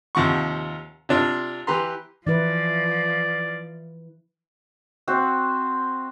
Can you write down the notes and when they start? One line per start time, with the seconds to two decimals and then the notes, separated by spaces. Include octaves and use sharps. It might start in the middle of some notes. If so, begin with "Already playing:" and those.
0.15 D#2 C3 F3 F#5 C#6
1.09 C3 D4 F4
1.67 E3 G4 B4 A#5 C6
2.27 E3 F3 E4 B4 D5
5.08 C4 F#4 C5 E5